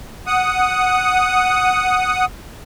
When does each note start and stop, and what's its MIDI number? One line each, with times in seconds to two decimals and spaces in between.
0.27 2.25 78
0.27 2.25 87